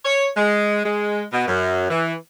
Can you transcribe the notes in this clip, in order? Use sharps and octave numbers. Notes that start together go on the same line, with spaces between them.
C#5
G#3
G#3
B2
F#2
E3